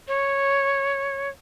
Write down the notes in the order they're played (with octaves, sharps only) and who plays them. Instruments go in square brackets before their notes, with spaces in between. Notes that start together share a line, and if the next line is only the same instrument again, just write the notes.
[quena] C#5